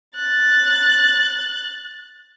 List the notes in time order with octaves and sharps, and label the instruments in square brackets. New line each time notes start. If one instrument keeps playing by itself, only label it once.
[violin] F#6 A6